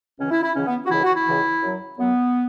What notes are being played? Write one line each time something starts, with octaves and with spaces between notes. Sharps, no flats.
C#2 C#3 E3 C#4
E4
E4
C#2 C#3 E3 C#4
B3
F#4
C#2 C#3 E3 E4
F#4
E4
C#2 C#3 E3
F#2 F#3
F#2 F#3 B3